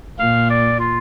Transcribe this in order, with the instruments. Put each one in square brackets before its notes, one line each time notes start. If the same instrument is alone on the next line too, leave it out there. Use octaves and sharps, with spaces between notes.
[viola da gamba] A#2 [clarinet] F5
[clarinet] D5
F4